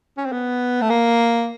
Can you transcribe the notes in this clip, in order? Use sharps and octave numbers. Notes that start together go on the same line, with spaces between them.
C#4
C4
B3
A3
A#3